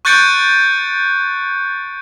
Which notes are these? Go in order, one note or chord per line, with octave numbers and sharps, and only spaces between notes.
C#6 F#6 G6 A6 C#7 D7